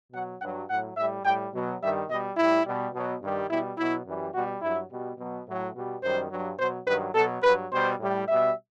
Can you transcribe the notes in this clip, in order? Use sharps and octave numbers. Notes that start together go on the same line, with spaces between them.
B2 F#3 F#5
G2 F#3 F#5
A2 F#3 F#5
A2 G3 E5
A2 G3 G5
B2 F#3
G2 D#3 G3 E5
B2 G3 D#5
A2 G3 E4
B2 G3
B2 F#3
G2 D#3 G3
B2 G3 E4
B2 F#3 E4
F#2 E3 G3
B2 G3 F#4
G2 F#3 E4
B2 G3
B2 F#3
A2 F#3
B2 G3
F#2 D#3 G3 C5
G2 F#3
B2 F#3 C5
G2 D#3 F#3 B4
B2 F#3 A4
G2 F#3 B4
B2 G3 C5
A2 G3
B2 G3 E5